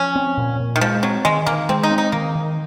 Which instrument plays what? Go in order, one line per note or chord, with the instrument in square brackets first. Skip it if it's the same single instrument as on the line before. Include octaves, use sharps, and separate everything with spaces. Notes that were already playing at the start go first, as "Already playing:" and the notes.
Already playing: [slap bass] F3 [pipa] C#4
[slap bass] C4
A#2
A#2
[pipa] D#3
[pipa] F3 [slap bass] G#3
[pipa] F#3 [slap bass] C4
[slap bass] D#3 [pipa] G#3
[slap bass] D#3 [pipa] A#3
[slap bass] G#3 [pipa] C4
[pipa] D#4
[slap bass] C4
[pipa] D#4
[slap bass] D#3 [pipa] A#3
[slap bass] D#3